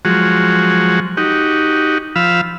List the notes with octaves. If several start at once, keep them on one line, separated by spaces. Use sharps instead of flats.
F3 F#3 G#3 F#4
D#4 F#4 G4
F3 F5 B5 E6